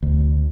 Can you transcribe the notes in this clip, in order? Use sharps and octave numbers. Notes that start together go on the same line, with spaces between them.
D2